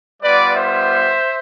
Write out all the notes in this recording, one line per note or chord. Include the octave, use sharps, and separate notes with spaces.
G3 B3 F4 B4 D5
C5 E5